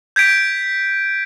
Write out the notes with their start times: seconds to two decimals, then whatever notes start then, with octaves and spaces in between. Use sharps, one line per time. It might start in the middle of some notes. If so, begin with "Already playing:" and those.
0.16 G6 G#6 B6 D7